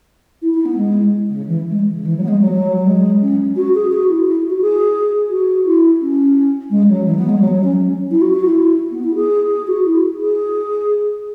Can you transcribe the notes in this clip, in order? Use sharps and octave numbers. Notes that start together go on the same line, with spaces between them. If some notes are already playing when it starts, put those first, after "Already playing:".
E4
E4
B3
G#3
C#3
E3
G#3
C#3
E3
F#3
B3
G#3
F#3
F#3
F#3
G#3
C#4
F#4
G#4
F#4
E4
E4
F#4
G#4
F#4
E4
C#4
G#3
F#3
E3
B3
G#3
F#3
F#3
C#4
E4
F#4
F#4
E4
E4
B3
E4
G#4
G#4
F#4
E4
G#4